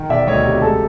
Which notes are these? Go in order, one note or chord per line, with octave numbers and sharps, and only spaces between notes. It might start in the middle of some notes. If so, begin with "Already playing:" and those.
Already playing: D#3
E1 D5 E5
D2 C#5 D#5
C3
G#3 A4